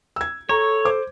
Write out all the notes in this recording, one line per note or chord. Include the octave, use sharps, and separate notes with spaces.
E6 G#6
A4 C#5 A#5 C#6
C5 D6